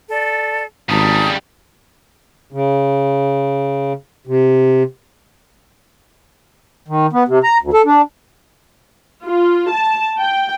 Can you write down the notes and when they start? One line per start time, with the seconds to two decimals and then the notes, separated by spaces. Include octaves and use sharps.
0.11 A4 D5
0.89 G#1 C#3 G3 A5 A#5 D#6
2.52 C#3
4.27 C3
6.88 D#3
7.13 B3
7.28 C3
7.43 A#5
7.61 D2
7.73 A4
7.85 D4
9.23 F4
9.71 A5
10.19 G5